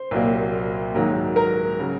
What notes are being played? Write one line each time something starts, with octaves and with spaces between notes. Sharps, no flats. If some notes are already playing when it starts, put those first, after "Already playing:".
Already playing: C5
C2 A#2 F#3 A#3
G#2 D#3 F#3 A#3
A#4 A#5
C#3 F#3